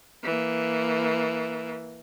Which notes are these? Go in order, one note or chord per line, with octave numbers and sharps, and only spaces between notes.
E3 A#3